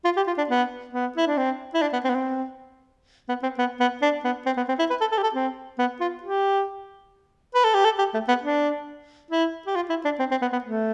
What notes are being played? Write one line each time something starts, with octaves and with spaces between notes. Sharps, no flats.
F4
G4
F4
D4
B3
B3
E4
D4
C4
E4
D4
B3
C4
B3
C4
B3
C4
B3
B3
D4
B3
C4
B3
C4
E4
B4
A4
A4
G4
A4
C4
B3
F4
G4
B4
A4
G4
A4
G4
A3
B3
D4
E4
G4
F4
E4
D4
C4
C4
B3
B3
A3